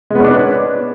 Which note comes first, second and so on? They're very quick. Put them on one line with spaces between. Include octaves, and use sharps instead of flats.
G#3 B3 C#4 D4 B4